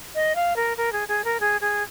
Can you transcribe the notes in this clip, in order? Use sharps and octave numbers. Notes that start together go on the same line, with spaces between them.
D#5
F5
A#4
A#4
G#4
G#4
A#4
G#4
G#4